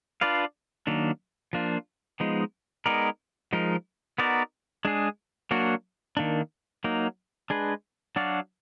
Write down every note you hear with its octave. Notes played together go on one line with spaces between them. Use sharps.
D4 F4 B4 D5 F5
D#3 F#3 A#3 D4
F3 A#3 D4 F4
F3 G#3 B3 D#4
G#3 B3 D#4 A#4 D5
F3 G#3 D#4 A#4
B3 D#4 F#4 A#4 D5
G#3 D4 G#4
F#3 A#3 D4 F#4
D#3 A#3 D4
F#3 A#3 D#4
G#3 D4 G#4 B4
F#3 D4 F#4 D5 F5